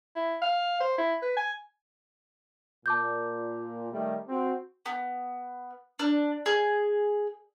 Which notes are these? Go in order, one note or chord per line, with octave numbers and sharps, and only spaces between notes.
E4
F5
C5
E4
B4
G#5
A#2 A5 D6 G6
D#3 G3 A3
C4 F#4
B3
D4
G#4